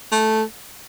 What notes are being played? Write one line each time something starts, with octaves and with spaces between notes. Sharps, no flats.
A3